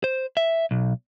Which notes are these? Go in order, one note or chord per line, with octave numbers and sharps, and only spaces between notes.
C5
E5
B1